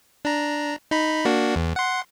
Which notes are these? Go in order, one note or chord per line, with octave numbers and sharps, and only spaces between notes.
D4 A#5
D#4 B5
A#3 D4 F#4
E2
F#5 C6